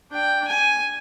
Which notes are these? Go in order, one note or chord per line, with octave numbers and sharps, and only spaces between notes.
D4 G5
G#5